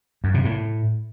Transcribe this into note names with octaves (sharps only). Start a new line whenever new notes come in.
F#2
C3
A2